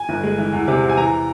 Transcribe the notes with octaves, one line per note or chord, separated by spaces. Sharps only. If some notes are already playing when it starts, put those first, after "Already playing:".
Already playing: G#5
G1
G#3
E3
E2
C3
E2
G#5
E3 A#5